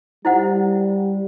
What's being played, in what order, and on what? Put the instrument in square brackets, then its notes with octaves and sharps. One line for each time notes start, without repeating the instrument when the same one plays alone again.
[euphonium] G3 [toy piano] E4 C5 F#5